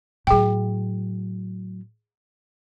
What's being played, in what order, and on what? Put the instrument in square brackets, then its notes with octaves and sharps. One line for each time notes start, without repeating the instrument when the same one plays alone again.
[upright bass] A2 F#3 [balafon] G#4 G5